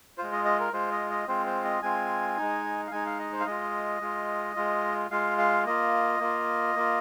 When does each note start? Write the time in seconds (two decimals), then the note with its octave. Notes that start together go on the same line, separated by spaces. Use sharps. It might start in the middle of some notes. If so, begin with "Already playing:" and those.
0.18 G#3 F4 C5
0.32 D#5
0.45 D#5
0.60 A#4
0.73 G#3 F4 C5
0.91 D#5
1.10 D#5
1.28 G#3 C4 F4 C5
1.46 C5
1.64 D#5
1.82 G#3 C4 F4 G#5
2.37 G#3 D#4
2.87 F5
2.91 G#3 D#4 G#5
3.06 F5
3.19 D#5
3.32 C5
3.40 F5
3.46 G#3 F4 D#5
4.01 G#3 F4
4.56 G#3 F4
5.11 G#3 F4 F5
5.38 F5
5.66 A#3 F4 D#5
6.20 A#3 F4
6.75 A#3 F4